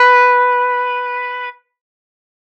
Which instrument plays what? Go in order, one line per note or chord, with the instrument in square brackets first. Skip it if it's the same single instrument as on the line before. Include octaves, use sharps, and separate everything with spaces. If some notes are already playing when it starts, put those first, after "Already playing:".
Already playing: [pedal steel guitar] B4